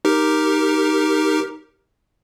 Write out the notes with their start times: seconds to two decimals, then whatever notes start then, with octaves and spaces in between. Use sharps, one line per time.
0.05 D#4 G4 A#4